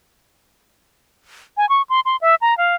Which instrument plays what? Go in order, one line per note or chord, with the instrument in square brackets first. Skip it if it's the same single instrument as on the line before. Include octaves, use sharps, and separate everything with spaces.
[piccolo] G#5
C#6
C6
C6
E5
A#5
F5